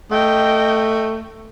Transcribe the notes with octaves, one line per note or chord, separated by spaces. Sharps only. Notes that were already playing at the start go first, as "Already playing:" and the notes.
A3 D#5 G5